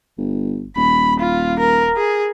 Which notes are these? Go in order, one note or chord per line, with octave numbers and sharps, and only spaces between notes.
G1
D#1 B5
F4
A#4
G#4